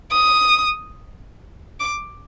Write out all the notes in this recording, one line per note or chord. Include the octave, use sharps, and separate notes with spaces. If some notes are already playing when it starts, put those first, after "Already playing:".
D#6
D6